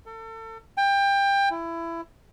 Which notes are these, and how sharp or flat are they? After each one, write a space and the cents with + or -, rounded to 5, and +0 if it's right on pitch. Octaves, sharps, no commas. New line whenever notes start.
A4 +35
G5 +25
E4 +20